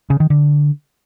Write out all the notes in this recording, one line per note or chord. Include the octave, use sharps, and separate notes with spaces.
C#3
D#3
D3